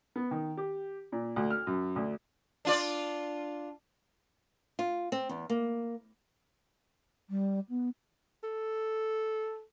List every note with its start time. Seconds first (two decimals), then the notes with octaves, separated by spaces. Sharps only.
0.16 B3
0.31 D#3
0.57 G4
1.12 A#2
1.36 D2
1.50 F6
1.67 F#2
1.96 D2
2.65 D4 F4 D5
4.79 F4
5.12 C4
5.29 E2
5.50 A#3
7.29 G3
7.69 B3
8.44 A4